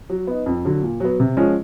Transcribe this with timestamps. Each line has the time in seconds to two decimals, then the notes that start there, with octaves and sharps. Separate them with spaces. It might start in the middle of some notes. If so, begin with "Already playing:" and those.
0.10 F#3
0.27 B3 D#4
0.46 F2
0.65 D3 F#3
0.82 A#2
1.00 F#3 B3
1.20 C3
1.37 F3 G#3 C#4